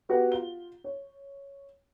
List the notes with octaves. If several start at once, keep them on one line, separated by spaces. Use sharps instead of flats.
B3 F#4 G4 B4 F#5
F4 G7
C#5